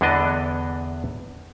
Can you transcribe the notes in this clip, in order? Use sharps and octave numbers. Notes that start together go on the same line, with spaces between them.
E2 D3 E3 B3 D4 D#5